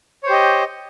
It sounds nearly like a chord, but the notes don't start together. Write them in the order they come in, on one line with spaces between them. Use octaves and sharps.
C#5 C5 G4 D#5